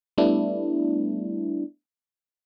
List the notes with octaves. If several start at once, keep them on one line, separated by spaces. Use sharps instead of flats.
G3 A3 B3 D4 E4